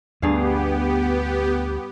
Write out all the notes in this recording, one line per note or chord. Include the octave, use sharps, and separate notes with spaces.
D2 G2 B3 G4 G#4 F5